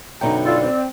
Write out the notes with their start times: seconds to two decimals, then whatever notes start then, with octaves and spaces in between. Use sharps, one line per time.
0.21 F#2 B2 D3 D#4 G5 A#5
0.45 F4 A4 D5
0.62 C4